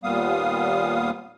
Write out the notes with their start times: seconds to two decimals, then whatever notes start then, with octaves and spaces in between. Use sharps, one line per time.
0.04 D#2 A#2 G3 B3 F5 D#6